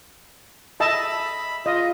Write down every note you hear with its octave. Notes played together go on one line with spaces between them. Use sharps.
D#5 E5 A5 B5
F4 D#5